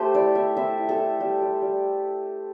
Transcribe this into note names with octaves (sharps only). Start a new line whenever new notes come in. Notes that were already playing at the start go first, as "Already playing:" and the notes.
Already playing: A3 G4 A4 C5
E4 D5
E4 E5
E4 E5
E4
A4
E4
G3 G4
G3
G3